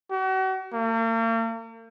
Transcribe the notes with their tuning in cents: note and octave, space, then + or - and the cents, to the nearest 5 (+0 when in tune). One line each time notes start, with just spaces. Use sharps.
F#4 +40
A#3 -45